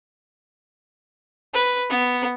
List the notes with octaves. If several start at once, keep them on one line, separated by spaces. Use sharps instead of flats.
B4
B3